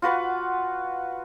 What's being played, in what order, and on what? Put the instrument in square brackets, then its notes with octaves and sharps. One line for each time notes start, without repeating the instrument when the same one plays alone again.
[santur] F4 F#4 B4 F#5